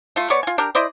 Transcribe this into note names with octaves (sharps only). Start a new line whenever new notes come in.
A3 F4
B3 C#5 D5 C#6
F4 G#5
D4 G4 A#4
E4 C5 D5 D#5